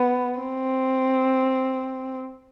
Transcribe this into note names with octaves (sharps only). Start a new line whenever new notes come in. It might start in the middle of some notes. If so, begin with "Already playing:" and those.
Already playing: B3
C4